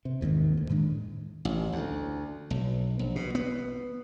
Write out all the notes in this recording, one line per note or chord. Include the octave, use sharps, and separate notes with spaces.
C3
F1 D#2 G#2 D#3
D2
A2 D#3 G#3 D4
A1
D2
B1
A#1
B2
B3